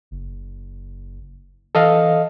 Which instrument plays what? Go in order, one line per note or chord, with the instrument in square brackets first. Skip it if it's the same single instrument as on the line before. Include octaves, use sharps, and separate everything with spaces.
[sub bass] F#1
[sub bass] E3 [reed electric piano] A4 D#5 F5